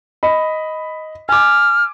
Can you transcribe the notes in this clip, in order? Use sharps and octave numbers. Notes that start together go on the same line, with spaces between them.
D#5 B5
G#5 D6 F6